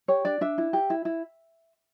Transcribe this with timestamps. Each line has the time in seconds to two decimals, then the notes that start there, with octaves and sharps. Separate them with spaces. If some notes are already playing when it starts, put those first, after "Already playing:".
0.08 G4 C#5
0.25 D4 D5
0.41 D4 E5
0.58 E4
0.73 G4
0.90 E4
1.05 E4